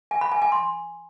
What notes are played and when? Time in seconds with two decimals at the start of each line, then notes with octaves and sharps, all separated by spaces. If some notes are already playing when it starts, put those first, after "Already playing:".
0.11 G#5
0.21 B5
0.32 G#5
0.42 G#5
0.52 C6